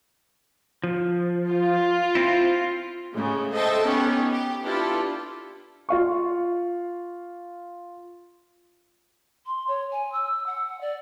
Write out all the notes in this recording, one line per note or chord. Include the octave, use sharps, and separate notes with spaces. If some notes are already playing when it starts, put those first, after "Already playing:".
F3
F4
C4 E4
A2 C#3 G#3
A4 C5 D#5 E5 G5 A5
B3 C#4 D#4 G4
G4
D4 E4 F4 G4 A4 B4
F4 F5 C#6
C6
C#5
G#5
E6
F#5
D5